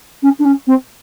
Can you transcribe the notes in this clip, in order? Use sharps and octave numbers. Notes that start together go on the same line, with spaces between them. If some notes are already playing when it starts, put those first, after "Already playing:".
C#4
D4
C#4
C4